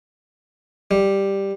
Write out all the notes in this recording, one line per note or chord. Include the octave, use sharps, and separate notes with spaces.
G3